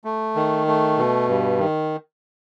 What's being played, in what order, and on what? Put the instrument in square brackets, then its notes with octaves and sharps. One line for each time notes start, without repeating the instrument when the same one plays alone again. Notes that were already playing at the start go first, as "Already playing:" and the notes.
[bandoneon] A3
D#3
A3
B2
G2
D#3